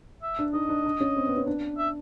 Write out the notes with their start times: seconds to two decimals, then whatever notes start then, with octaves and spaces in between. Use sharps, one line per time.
0.22 E5
0.39 D4
0.53 D#4 D#5
0.69 D4
0.86 D4
1.00 C#4
1.17 C4
1.27 B3
1.37 C#4
1.47 D4
1.78 E5